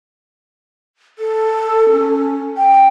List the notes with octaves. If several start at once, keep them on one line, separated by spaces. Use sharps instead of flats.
A4
C#4
G5